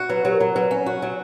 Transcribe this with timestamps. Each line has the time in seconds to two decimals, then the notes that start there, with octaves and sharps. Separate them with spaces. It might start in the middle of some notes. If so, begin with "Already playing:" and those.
Already playing: F#4
0.09 F#3 B4
0.25 F#3 G4
0.32 A#4
0.40 F#3
0.55 F#3 B4
0.71 C#4
0.86 F#4
1.02 F#3